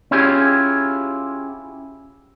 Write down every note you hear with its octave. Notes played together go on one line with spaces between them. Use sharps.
C#4 E4 F4 G4 G#4